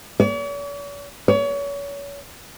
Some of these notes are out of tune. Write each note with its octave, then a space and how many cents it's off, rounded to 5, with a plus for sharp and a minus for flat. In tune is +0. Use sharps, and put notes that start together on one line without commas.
C#5 +45
C#5 +30